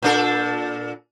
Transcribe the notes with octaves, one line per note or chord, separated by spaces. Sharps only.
A#2 D4 A4